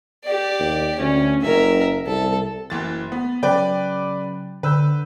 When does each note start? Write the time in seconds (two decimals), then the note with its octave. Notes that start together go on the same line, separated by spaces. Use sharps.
0.25 G4 D5
0.59 D#2
1.00 D2 C#4
1.43 F#1 A#4 E5
2.06 C2 A4
2.70 F#1 E3 A6
3.12 B3
3.43 C#3 F#3 B4 D5 G5
4.63 D3 B4 E6 G6